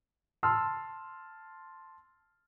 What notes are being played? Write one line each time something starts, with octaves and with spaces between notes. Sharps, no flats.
A5 C6 E6 F6